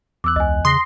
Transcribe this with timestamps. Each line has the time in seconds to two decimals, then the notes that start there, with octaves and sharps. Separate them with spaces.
0.24 E2 D6 E6 F#6
0.36 C#2 D#5 G#5
0.65 C#3 C6 D#6 A#6